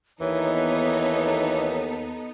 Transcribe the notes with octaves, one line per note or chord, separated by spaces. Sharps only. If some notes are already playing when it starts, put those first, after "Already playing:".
D#2 E3 B3 D#4 A4 C#5